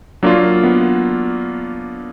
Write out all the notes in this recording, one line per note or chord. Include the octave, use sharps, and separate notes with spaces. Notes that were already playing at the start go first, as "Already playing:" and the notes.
F#3 A#3 D4 F4
B3